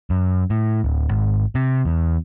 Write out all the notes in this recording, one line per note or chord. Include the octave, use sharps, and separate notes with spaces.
F#2
A2
D1
G#1
C3
E2